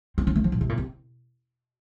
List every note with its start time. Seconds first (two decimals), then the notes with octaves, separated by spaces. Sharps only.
0.18 C4
0.27 C#4
0.36 A3
0.44 F3
0.52 A#2
0.61 C3
0.69 A#2
0.78 C3